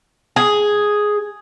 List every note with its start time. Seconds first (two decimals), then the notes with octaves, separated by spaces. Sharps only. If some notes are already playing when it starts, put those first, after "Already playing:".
0.36 G#4